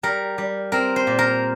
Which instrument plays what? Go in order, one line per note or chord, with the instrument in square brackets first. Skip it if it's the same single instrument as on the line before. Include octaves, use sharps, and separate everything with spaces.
[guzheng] G3 A#4
G3
C4 A#4
C5
A#2
A#4